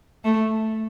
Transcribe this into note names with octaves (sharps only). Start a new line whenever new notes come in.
A3